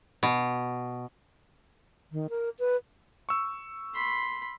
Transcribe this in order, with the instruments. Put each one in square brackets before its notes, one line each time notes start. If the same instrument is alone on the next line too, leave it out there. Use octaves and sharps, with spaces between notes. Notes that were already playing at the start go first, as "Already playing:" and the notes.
[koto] B2
[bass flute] D#3
A#4
B4
[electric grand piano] C#6 E6
[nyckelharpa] B5 C6